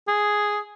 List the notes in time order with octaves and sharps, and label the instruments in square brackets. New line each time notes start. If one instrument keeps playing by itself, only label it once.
[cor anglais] G#4